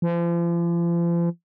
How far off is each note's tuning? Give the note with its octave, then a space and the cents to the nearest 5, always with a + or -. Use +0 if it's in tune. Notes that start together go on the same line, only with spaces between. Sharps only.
F3 -40